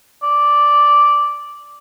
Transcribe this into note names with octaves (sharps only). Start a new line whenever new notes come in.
D5